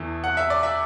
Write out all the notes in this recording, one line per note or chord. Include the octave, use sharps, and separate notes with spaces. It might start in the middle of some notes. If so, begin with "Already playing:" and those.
Already playing: E2 E3 A3
F#5
E5
D5
E5